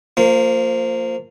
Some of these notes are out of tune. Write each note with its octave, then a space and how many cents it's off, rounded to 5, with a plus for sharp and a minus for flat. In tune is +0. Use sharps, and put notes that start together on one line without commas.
F3 +0 A#3 -25